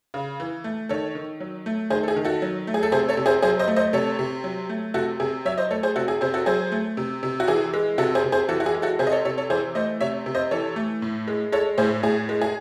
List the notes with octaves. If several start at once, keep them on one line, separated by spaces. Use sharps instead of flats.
C#3
E3
A3
D#3 A4 C#5
D#3
F#3
A3
D#3 G#4 C5
A4
G#4
D#3
F#4 A4
F#3
A3
G#4
A4
C3 G#4 C5
A4 C#5
C3
G#4 C5
F#3 G#4 C5
C5 D#5
A3
C5 D#5
C3 A4 C#5
C3
F#3
A3
C3 F#4 A4
C3 G#4
F#3 C#5 E5
C5 D#5
A3 A4 C#5
G#4 C5
C3 F#4 A4
G#4
C3 G#4 C5
F#4 A4
F#3 G#4 C5
A3
C3
C3
F#4
E3 G#4
G#3
C3 F#4 A4
G#4 C5
C3
G#4 C5
E3 F#4 A4
F#4
G#4
G#3
F#4 A4
C3 G#4 C5
D#5
A4 C#5
C3 A4 C#5
A4 C#5
E3 G#4 C5
A3 C5 D#5
C3 C#5 E5
C3
C5 D#5
E3 A4 C#5
A3
A2
G#3
G#3 A4 C#5
A2 G#4 C5
A2 G#4
G#3
G#4